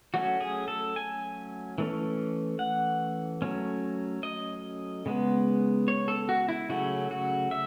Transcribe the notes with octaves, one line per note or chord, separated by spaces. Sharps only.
F#3 A3 C#4 F#4
G#4
A4
G#5
E3 A3 C#4
F#5
F#3 A3 C#4
D#5
C#3 G#3 B3
C#5
A4
F#4
E4
C#3 F#3 A3 C#4 F#4
F#4
E5